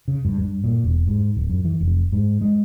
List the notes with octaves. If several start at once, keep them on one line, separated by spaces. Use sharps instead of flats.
C#3
G2
G2
A#2
E1
G#2
D1
F#2
E3
F1
G#2
G#3